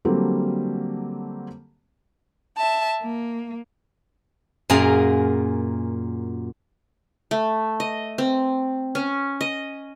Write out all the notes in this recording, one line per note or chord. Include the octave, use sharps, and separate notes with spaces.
D3 F#3 G3 A#3 C4 A4
E5 A5
A#3
F#2 A#2 G#4 A#4 F5
A3
D#5
C4
C#4
D#5